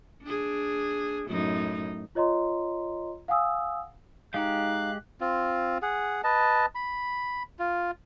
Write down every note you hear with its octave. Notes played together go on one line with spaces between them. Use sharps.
D4 G#4
F#2 A2 D#4
F4 C#5 D#5 A#5 C6
F5 F#5 G#5 D#6 E6
G#3 D#4 G4 F5 F#6
C4 F4
G#4 F#5
B4 D#5 A5
B5
F4